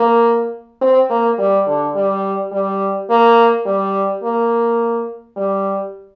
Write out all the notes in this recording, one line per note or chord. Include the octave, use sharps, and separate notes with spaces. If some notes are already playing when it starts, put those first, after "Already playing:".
Already playing: A#3
C4
A#3
G3
D3
G3
G3
A#3
G3
A#3
G3